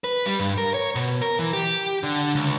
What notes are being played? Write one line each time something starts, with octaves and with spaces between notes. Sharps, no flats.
B4
G3
G2
A#4
C#5
B2
A#4
E3
G4
D3
C#2